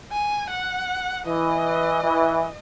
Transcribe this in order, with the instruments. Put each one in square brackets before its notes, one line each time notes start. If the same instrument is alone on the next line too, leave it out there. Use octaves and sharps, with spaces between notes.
[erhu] G#5
F#5
[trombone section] E3 [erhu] D#5
[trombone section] E3